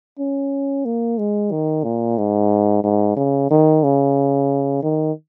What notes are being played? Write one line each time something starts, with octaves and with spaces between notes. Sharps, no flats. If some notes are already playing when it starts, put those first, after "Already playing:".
C#4
A#3
G#3
D#3
A#2
G#2
G#2
C#3
D#3
C#3
D#3